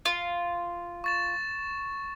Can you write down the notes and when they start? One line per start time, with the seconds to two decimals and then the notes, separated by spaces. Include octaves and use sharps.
0.05 F4
1.04 C#6 A6 E7